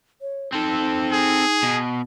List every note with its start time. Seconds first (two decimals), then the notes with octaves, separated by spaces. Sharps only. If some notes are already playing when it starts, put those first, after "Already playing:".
0.21 C#5
0.53 C4 D#4 A4
1.11 G#4
1.63 B2